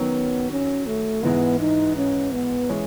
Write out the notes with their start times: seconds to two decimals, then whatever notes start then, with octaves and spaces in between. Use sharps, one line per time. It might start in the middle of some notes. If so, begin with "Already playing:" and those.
Already playing: D#3 F#3 B3 C#4
0.51 C#4
0.87 A3
1.23 G#2 E3 G#3 B3
1.60 D#4
1.97 C#4
2.33 B3
2.69 E3 G#3 C#4